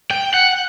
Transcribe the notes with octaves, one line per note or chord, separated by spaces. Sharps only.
G5
F#5